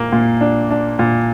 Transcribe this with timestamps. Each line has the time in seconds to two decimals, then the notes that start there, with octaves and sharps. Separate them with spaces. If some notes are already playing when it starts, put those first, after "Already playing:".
Already playing: A#2 A#3
0.12 A#2
0.41 D4
0.71 D4
0.99 A#2